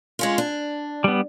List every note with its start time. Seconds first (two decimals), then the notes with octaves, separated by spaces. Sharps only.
0.19 G#3 C#4 F4
0.38 D4
1.04 G3 B3